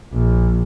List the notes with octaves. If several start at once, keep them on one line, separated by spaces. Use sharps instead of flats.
A#1